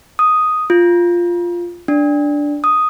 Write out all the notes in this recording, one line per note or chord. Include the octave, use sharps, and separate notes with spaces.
D#6
F4
D4
D#6